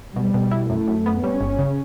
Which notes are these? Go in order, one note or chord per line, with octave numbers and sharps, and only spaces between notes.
B2 G3
B2
E4
F#2 A3
F#2
B3
G3 C#4
G1
C#3